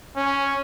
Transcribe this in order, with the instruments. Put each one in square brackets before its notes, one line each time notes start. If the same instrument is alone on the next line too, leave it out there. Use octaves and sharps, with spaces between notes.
[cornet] C#4